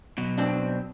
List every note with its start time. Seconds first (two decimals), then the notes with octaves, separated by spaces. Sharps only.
0.18 B2 F#3
0.38 C4 D4